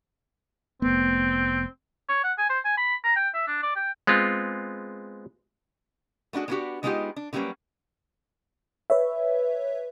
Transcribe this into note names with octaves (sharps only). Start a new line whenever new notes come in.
F1 A3 B3 C4
C#5
F#5
G#5
C5
G#5
B5
A#5
G5
E5
D4
D5
G5
G#3 B3 C4 F4
A3 B3 D4 F#4 G#4
G#3 A#3 B3 D4 F#4 G4
D3 G#3 B3 D#4 F4 G4
D4
D3 F#3 G3 A#3 C#4 B4
B4 C#5 E5